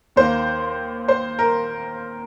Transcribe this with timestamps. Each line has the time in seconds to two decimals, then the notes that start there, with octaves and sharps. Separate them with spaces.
0.16 D#2 D#3 A#3 C5
1.08 C5
1.39 A#4